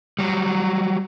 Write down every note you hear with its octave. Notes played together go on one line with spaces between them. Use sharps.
F#3 G3